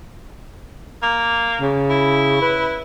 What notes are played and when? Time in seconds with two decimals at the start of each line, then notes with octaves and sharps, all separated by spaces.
1.02 A#3
1.61 C#3
1.90 E4
2.42 B4